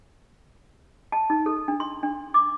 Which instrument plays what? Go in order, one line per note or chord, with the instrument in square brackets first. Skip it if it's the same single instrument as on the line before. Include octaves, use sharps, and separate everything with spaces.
[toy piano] A5
D#4
A4
D4
C6
D4
D6